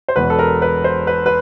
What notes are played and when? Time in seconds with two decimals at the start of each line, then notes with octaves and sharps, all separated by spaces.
0.09 C5
0.16 E1 E2 B2 B4
0.30 A4
0.39 A#4
0.62 B4
0.84 C5
1.07 B4
1.26 B4